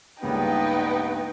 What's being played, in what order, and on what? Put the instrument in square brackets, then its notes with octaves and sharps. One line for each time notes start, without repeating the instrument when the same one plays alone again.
[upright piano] C#2 C#3 A#3 [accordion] G2 B3 [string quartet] D#4 B4 [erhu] G5